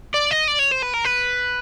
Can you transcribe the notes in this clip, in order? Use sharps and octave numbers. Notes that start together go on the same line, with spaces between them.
D5
D#5
D5
C#5
C5
B4
A#4
B4